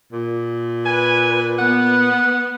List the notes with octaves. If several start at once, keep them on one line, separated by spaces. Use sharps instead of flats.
A#2
B4 G#5
B3 F#5